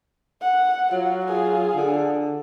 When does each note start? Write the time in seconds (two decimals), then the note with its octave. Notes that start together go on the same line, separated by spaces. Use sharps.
0.42 F#5
0.92 F#3 F4
1.25 F4 G#4
1.75 D3